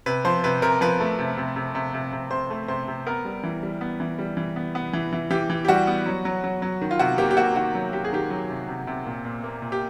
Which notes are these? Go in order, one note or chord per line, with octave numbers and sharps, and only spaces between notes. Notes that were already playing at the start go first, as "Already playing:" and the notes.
C3 B4
F3 C5
C3 B4
C3 A#4
F3 B4
A3
C3
C3
C3
C3
C3
C3
C3 C5
A3
C3 C5
C3
B3 A#4
G3
E3
G3
B3
E3
G3
E3
B3
B3
E3
E3
E3 G4
E3
G4
G3 F#4
B3
F#3
F#3
F#3
F#3
D#3
F4
C3 F#4
A#3 G4
G4
A#3 F#4
D#3 F#4
F#3
C3 G4
G#4
D#3 G4
F#3
C3
C3
C3
A#2
A#2
A#3
A#2
G4